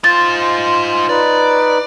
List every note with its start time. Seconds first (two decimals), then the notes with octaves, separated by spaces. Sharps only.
0.04 D#4 F4 C5 A6
1.09 D#4 B4 D5